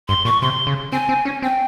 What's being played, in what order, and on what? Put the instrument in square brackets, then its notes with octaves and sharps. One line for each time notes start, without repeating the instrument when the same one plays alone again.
[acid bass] G2 [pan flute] C6
[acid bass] A#2 [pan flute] C#6
[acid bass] C3 [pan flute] C6
[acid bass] C#3
[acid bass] C4 [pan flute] G#5
[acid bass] C4
C#4
[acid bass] C4 [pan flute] G5